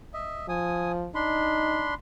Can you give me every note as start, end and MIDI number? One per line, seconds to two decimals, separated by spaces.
0.14 0.47 75
0.14 0.47 76
0.49 1.08 53
0.49 0.92 80
0.49 0.92 87
1.15 1.94 62
1.15 1.90 63
1.15 1.94 83
1.15 1.94 84